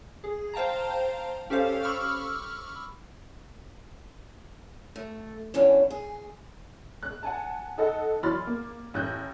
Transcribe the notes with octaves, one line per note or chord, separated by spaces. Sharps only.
G#4
C5 F5 G5 A5 A#5
C#4 G4 A4 C5 F5
B5 C#6 D6 E6 F6
A3
E2 B2 C#4 D4
G#4
F#6
F#5 G#5 A5
D#4 A4 D#5 F#5
E3 F#3 B5 C6 F6 A6
A#3
A1 F#6 G6